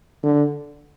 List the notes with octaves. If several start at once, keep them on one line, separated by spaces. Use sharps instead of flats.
D3